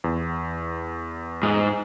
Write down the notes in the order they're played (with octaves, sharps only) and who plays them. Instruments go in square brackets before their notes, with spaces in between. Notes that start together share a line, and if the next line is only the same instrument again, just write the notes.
[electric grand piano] E2
[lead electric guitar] G#2